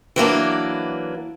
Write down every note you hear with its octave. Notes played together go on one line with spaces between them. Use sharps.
E3 F#3 A#3 D4